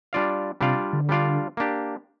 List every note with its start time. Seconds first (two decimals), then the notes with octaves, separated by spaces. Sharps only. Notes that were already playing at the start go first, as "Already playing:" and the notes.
0.13 G3 D4 F4 D5 F5
0.61 C3 G3 D4 F4 D5 F5
0.93 D3
1.09 G3 D4 F4 D5 F5
1.57 A#3 D4 G4